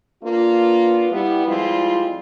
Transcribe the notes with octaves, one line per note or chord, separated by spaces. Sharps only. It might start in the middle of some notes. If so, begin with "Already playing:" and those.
A#3 B3 D4 F4
G3 B3 E4
F3 G3 G#3 C4 E4 F4